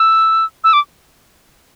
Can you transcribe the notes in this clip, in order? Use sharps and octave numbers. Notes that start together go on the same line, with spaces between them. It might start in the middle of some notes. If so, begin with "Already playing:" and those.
Already playing: E6
E6
D6